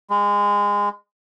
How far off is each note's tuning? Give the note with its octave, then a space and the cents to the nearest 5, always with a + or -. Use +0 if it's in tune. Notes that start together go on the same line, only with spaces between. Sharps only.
G#3 -25